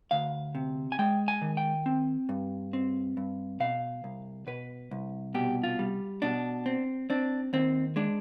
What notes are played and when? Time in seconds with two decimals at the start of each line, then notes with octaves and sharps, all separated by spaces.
0.11 D2 F5
0.55 C3
0.92 G#5
0.99 G#3 G5
1.28 G#5
1.41 D#3
1.57 G5
1.86 C4
2.29 G2
2.73 C4
3.17 G2
3.60 B2 F5
4.04 C2
4.47 B2 B4
4.91 C2
5.34 B2 G4
5.63 F4
5.79 G3
6.22 B2 D4
6.66 C4
7.10 C4 D4
7.53 D#2 C4
7.96 G#3 D4